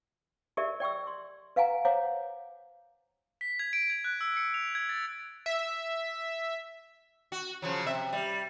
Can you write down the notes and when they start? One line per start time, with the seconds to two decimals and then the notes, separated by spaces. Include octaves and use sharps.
0.57 G4 G#4 A#4 D5 E5
0.80 D5 G5 C#6 E6
1.07 C6
1.56 B4 F5 F#5 G#5 A#5
1.85 C5 C#5 F5 F#5 A#5 D6
3.41 B6
3.59 G#6
3.73 D7
3.90 G#6
4.04 F#6
4.21 E6
4.36 C#7
4.54 F7
4.75 G#6
4.89 A6
5.46 E5
7.32 F#4
7.62 C#3 F3 F#3
7.86 C3 E5
8.13 G3